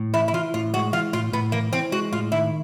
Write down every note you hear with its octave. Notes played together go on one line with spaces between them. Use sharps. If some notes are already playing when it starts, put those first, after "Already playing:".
Already playing: A2
E3 E4
E4
E3 F4
A2 F4
G#3 F#4
E3 F4
A2 F4
A2 B3
E3 A#3
E3 C4
G#3 F#4
A2 F4
D#3 E4